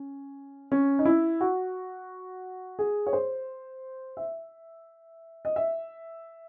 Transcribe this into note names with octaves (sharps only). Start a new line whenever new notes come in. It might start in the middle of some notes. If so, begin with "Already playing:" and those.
Already playing: C#4
C#4
D#4
E4
F#4
G#4
C#5
C5
E5
D#5
E5